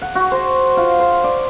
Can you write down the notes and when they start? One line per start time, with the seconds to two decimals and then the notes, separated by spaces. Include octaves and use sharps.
0.02 F#5
0.15 F#4
0.32 C5
0.77 F4
0.99 C5
1.24 D5